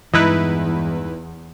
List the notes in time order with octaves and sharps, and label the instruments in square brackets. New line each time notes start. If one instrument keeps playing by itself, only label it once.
[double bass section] E2 [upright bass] G2 G#3 [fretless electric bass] E3 [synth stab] D#4 E4 B4